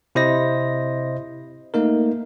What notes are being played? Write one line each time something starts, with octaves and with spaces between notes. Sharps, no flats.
C3 E4 C5 D#5 A#6
A3 A#3 D#4 A#4